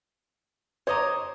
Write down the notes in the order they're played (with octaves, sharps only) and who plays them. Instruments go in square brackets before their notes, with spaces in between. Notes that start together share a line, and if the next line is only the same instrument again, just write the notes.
[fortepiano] C5 A#5 [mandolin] C#5 D#5 D6